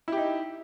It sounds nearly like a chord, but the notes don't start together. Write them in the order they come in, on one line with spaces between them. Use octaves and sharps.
E4 G4 D#4